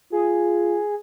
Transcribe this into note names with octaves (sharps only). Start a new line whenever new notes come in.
F4 G#4